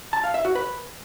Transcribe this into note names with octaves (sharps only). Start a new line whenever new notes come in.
A5
F5
E5
F#4
B4